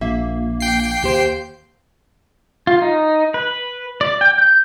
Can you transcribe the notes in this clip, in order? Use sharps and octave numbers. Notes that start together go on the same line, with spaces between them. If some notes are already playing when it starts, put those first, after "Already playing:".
A#1 A#3 E5
G5 C7
D#2 G4 C5
F4
D#4
B4
D5
G5
G6